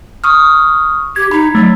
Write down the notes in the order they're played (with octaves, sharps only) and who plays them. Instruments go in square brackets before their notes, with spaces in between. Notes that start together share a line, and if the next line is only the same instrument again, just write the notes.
[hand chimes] C#6 D#6 F6
[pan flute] G4 [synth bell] G#6
[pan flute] D#4 [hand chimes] B5
[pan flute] F#3 [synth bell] A3